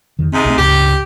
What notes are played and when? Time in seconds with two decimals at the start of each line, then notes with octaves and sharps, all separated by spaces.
0.19 F2 D#3
0.32 G#2 C3 C4
0.45 B1 A3 C4
0.58 C#2 G2 C#3 G4